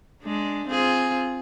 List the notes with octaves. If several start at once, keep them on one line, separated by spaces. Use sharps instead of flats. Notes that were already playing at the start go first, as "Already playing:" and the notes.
G#3 D4
C4 F4 G#4